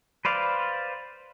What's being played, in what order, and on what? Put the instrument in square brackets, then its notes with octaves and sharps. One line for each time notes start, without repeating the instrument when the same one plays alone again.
[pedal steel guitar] B4 C5 D5 F5